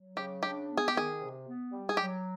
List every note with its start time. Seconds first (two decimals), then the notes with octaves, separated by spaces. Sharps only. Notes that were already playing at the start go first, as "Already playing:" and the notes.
Already playing: F#3
0.17 C#3 G4
0.43 D4 G4
0.69 B3
0.77 G#4
0.88 G4
0.95 D#3 G#4
1.20 C3
1.45 B3
1.71 G3
1.89 G#4
1.97 F#3 G4